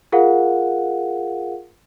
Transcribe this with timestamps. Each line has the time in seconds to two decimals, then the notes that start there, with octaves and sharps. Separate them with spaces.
0.12 F4 G#4 A#4 F5 F#5